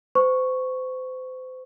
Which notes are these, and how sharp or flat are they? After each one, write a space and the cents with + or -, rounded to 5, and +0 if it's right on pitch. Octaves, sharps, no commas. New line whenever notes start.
C5 -35 C#6 +0